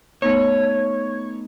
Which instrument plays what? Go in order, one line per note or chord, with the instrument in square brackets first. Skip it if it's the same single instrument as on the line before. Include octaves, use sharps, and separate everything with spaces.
[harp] A3 B3 D#4 [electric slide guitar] C#5